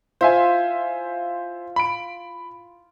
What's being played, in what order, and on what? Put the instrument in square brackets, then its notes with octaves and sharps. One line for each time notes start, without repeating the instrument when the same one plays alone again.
[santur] F4 [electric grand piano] C5 E5 G#5
[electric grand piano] B5 D7